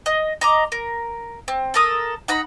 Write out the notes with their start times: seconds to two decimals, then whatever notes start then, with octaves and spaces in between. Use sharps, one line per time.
0.06 D#5
0.41 D#5 A#5 D6
0.72 A#4
1.48 C4
1.74 A4 A#4 D#6
2.28 D#4 F#5 A#5 B5